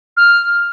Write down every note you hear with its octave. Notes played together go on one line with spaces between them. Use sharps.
F6